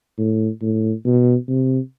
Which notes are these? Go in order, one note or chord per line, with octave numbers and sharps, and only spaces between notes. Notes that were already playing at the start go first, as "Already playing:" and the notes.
A2
A2
B2
C3